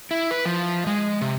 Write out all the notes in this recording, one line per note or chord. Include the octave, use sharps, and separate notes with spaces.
E4
B4
F3
G#3
C3